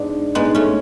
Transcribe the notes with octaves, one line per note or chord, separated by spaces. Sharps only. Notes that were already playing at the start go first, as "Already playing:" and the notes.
Already playing: G#2 B3 D4
G#2 G#3 B3
A3 C#4